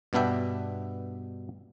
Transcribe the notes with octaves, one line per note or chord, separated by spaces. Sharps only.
G2 B2 B3 D4 E5 G5